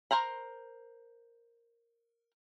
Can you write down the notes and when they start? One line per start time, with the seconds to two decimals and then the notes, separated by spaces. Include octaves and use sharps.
0.11 A#4 C5 A#5 B5